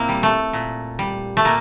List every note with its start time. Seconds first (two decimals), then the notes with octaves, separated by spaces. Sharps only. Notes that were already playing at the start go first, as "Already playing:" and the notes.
Already playing: A#2 A#3 C4 E4
0.09 G3
0.23 A3
0.53 A#2
0.99 G3
1.37 A3
1.45 A#2 A#3